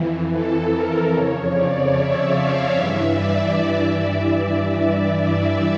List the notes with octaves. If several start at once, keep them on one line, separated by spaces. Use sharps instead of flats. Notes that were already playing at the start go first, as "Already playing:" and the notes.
Already playing: F2 E3
A4
A#4
F2 C#3 F3 C#5
D5
E5
F5
G2 E3 E5
D5